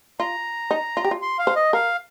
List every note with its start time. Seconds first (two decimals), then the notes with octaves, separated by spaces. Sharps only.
0.20 F4 A#5
0.71 D#4
0.97 F4
1.04 G4
1.11 F4
1.22 C6
1.39 F5
1.47 C5
1.56 D#5
1.73 A#4 F5